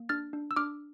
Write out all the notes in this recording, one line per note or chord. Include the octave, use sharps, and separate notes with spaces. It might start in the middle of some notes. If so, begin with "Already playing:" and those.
Already playing: A#3
D4 F6 A6
D4
E6
D4 D6 F6